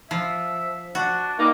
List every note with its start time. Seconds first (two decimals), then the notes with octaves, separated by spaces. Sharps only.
0.11 F3 E5
0.95 D4 F#4
1.38 G3 A#3 D#4